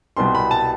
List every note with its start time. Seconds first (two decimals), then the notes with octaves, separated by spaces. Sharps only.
0.17 C2 B2 G3 C6
0.35 B5
0.51 A5